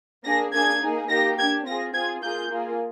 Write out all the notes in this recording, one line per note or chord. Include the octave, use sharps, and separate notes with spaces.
A#3 D4 G#4 A#6
A#3 D4 G#4 G#6
A#3 D#4 G#4
A#3 D#4 G4 A#6
D4 G4 G#6
C4 F4 G#4 A#6
C4 F4 G#4 G#6
A#3 F4 G#4 G6
A#3 F4 G#4